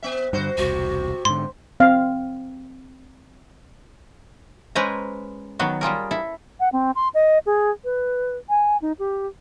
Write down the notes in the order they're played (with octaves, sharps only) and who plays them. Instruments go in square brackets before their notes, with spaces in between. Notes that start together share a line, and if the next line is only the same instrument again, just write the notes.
[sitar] B3 E5
[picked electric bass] G2 D3 [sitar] F#4 C5
[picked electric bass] E1 C2 [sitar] C3 [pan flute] F#4
[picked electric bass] G#2 D3 [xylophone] C6
[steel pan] C4 F5
[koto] G#3 C#4 B4 C5 G#5 A#5
D#3 F#3 B3 F#4
G3 F4 G#4 A#4
E4 A4
[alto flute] F#5
C4
C6
D#5
G#4
B4
G#5
D#4
G4